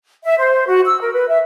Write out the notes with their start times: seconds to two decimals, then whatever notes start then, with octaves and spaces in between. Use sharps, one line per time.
0.24 E5
0.39 C5
0.67 F#4
0.86 E6
1.01 A#4
1.13 B4
1.28 E5